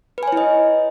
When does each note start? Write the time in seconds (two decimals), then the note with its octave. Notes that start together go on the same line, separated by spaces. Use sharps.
0.18 B4
0.23 G#5
0.28 C#5
0.32 E4
0.37 D#5